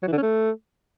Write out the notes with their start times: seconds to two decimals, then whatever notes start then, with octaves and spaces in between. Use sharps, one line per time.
0.02 F#3
0.07 E3
0.13 D3
0.18 C#4
0.23 A3